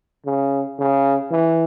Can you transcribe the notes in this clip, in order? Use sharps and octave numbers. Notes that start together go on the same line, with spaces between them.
C#3
C#3
E3